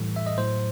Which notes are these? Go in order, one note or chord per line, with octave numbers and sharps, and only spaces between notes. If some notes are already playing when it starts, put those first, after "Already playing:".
Already playing: A2 E3 G3 A4
E5
D#5
A2 F#3 C5